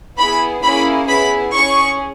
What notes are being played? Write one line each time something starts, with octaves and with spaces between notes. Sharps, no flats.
B3 E4 G#4 B5
A#3 C#4 E4 G#4 B5
B3 E4 G#4 B5
C#4 G#4 C#6